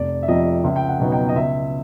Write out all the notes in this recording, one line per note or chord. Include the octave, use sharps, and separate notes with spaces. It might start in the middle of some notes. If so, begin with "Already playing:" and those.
Already playing: F1 D5
E5
F2 C3 F3 D#5
C#2 E5
G5
F#5
B2 F#3 B3 D#4
G5
D#5
C#2 E5